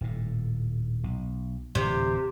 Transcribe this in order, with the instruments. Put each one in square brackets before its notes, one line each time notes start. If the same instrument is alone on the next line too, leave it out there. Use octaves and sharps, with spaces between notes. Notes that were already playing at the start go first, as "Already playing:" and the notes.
[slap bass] D#1 A2
B1
[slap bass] D1 E3 [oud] C3